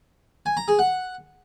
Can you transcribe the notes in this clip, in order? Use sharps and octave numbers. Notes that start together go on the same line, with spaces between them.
G#5
A#5
G#4
F#5